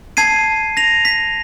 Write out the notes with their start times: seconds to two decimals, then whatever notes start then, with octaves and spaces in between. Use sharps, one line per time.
0.17 A5 G#6 C7 D#7
0.77 A#6 F7
1.05 B6